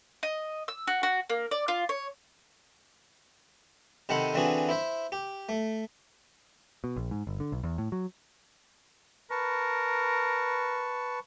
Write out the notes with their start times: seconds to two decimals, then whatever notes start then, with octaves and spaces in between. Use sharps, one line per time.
0.23 D#5
0.68 E6
0.87 F#4
1.03 F#4
1.30 A#3
1.51 D5
1.68 F4
1.89 C#5
4.09 C3 D#3 A4 F#5 B5 C6
4.34 D3 E3 C4 D4 F#4 G#4
4.69 E4 C5 E5
5.12 G4
5.49 A3
6.84 B2
6.96 A#1
7.11 G#2
7.27 G1
7.40 D3
7.52 B1
7.64 E2
7.78 A2
7.92 F#3
9.31 A#4 B4 A5 C#6